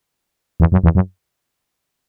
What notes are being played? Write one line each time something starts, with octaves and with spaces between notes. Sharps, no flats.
E2
F#2
E2
F#2